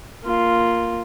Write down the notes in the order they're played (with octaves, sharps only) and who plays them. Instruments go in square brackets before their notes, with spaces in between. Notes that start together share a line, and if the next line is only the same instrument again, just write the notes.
[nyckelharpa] A#3 F4